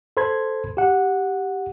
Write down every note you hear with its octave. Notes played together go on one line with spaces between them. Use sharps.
A4 C5 B5 C6 G#6
G4 F#5